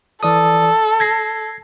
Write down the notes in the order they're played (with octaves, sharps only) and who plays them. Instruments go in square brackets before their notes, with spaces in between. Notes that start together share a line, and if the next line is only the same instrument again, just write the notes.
[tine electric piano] E3 D5 D#6 [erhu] A4
[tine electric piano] G#6 A#6 C7